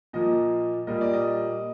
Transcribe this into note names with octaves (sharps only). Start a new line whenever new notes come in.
A#2 F3 A#3 D#5
A#2 G3 A#3 D#5
D5
D#5